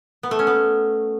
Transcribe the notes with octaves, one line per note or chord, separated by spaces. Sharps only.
B3
A3
C#4
B3